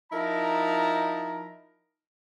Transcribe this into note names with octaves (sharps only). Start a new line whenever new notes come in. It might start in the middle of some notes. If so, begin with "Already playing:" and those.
F3 D#4 E4 A#4 A5 A#5